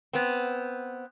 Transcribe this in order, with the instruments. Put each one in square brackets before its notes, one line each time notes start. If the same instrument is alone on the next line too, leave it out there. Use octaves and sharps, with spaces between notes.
[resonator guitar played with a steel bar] B3 C4